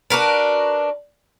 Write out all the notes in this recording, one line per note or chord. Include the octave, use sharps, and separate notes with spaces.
D4 F#4 A#4 B4